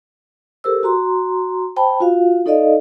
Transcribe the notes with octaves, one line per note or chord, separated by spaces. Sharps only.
G4 A4 A#4 C5 E6
F#4 A#5 C6
C5 G5 A5 B5
F4 F#4 F5
D#4 A4 D5 D#5 F5